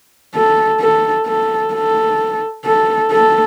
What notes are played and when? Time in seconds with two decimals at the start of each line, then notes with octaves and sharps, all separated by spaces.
0.35 A4
0.81 A4
1.27 A4
1.73 A4
2.65 A4
3.12 A4